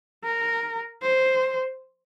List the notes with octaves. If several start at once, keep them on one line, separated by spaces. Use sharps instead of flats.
A#4
C5